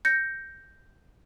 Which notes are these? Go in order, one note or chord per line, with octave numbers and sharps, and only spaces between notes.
G6 A#6 C#7